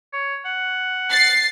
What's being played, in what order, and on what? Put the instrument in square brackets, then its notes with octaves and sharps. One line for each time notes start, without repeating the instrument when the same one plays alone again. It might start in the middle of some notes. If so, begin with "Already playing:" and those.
[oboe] C#5
F#5
[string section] A6 C7